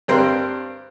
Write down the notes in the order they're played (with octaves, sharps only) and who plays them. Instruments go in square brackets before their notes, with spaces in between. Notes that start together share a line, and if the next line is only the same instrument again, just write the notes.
[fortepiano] G2 G3 C4 A#4 G5 C6